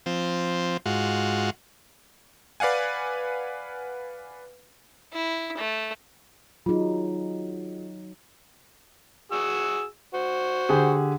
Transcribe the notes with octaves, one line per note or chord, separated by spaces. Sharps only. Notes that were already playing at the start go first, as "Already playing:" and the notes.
F3 C4
G#2 F4 F#4
B4 D5 F5 F#5 G#5
E4
A3
F#3 D#4 F4 G#4
F#4 G#4 E6
F#4 C5
D3 G4 G#4